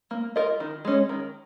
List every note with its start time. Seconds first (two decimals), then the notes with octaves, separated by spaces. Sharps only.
0.11 A#3
0.36 F4 A#4 D#5
0.60 D#3
0.85 G#3 C#4
1.09 D#3